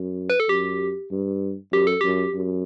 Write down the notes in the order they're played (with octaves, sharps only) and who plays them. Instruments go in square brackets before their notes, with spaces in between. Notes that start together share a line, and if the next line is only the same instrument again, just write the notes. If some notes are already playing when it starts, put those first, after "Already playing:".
Already playing: [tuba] F#2
[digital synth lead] B4
A4
[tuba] F#2 [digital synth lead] G4
[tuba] G2
[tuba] F#2 [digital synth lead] G4
[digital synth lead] A4
[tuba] F#2 [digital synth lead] G4
[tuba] F#2